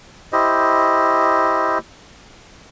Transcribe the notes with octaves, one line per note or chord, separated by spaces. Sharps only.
E4 G4 C5 D#5